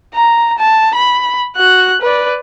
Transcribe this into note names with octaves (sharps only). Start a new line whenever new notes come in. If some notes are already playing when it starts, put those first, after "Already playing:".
A#5
A5
B5
F#4 F#6
B4 D5